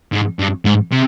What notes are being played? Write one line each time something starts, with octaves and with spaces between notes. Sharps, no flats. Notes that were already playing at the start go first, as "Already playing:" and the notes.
G#2
G2
G#2
C3